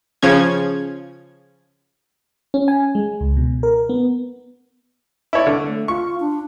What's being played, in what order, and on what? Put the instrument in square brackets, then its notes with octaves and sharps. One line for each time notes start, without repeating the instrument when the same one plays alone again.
[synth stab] C#3 F3 C#4 G#6
[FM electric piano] C#4
G#5
G#3
C#2
B2
A#4
B3
[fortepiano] E4 C#5 D5
D3
[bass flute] A3
[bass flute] F4 [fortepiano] C#6
[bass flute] D4